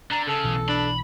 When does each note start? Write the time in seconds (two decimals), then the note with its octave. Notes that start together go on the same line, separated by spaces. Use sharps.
0.11 D3 D4 A#5
0.27 C#3 A4
0.44 B1 B2 E3
0.69 D4 B5